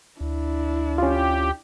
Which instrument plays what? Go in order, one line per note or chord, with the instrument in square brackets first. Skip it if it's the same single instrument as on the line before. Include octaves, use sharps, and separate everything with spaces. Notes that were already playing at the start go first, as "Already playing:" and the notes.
[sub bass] D2 [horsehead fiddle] D4 E4
[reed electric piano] C#4 F4 [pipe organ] G4